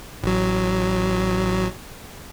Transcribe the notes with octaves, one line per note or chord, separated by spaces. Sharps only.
A1 F#3